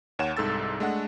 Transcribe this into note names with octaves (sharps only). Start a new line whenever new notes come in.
D#2 C#5 F#5 E7
C2 G#2 A4 E6 A6
G#3 A3 D4 F#5